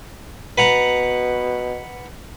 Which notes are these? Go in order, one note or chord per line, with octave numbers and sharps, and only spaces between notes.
B2 B4 F#5 A#5